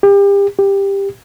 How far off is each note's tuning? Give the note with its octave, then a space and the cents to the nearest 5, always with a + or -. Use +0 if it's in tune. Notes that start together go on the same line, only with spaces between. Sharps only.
G4 +35
G4 +15